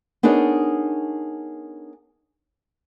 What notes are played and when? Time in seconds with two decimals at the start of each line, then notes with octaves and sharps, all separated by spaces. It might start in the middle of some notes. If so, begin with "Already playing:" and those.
0.23 B3 D4 D#4 G#4 A#4 C#5